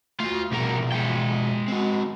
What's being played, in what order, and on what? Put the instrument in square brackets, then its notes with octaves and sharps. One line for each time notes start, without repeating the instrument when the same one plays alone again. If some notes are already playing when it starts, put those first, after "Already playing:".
[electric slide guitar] A3 F#4 [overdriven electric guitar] F4
[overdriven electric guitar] C2 A#4 [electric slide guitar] B2 F3 G#4
[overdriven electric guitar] G#3 G5
[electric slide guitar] C4 F#4